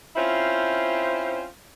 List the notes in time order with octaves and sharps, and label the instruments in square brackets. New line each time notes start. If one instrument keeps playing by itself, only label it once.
[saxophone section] C4 C#4 E4 F4 C5